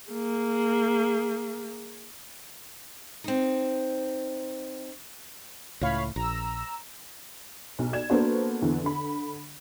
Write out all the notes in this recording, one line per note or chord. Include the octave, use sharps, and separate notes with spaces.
A#3 G#4
C4 D#4
C#2 A2 C#5 F5 B5
A#1 A#5 E6
B1
D5 G#6 E7
A#3 B3 D4 F#4 A4 C5
E2 D3 E3
D3 B5